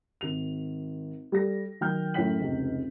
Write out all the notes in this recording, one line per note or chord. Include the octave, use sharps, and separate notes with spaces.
G#1 F7
G3 A4 A#6
D#3 F#3 G5 F6 G6
F#2 A2 C#5 G5 B6 F#7
F1 C#2